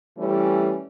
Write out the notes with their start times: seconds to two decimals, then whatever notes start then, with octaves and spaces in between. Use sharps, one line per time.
0.17 E3 G3 A3 C#4